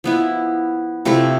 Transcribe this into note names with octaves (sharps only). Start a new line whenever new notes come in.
F3 B3 E4
C3 F3 A3 E4